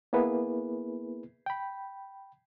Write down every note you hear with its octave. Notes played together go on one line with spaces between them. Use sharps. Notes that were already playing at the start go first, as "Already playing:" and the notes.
A#3 B3 E4 G#4 B4
G5 B5